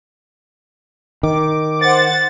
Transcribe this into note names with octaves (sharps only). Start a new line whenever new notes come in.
D#3 D6
C5 F#5 A6